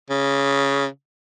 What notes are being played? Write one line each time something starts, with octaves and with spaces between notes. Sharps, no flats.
C#3